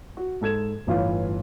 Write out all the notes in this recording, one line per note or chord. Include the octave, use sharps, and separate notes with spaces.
F#4
G#2 A4 G#6 E7
G1 A2 E3 F4 C#5 F5